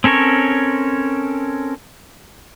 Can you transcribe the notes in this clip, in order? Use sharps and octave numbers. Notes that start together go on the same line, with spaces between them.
C4 C#4 A4 A#4 C#5